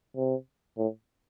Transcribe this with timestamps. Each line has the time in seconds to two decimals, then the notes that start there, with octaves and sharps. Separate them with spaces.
0.17 C3
0.78 A2